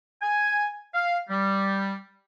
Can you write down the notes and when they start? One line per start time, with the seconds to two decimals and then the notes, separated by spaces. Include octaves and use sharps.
0.22 G#5
0.95 F5
1.30 G3